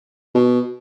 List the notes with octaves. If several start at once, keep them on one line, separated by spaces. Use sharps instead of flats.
B2